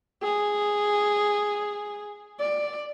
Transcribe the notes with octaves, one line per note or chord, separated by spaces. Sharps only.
G#4
D5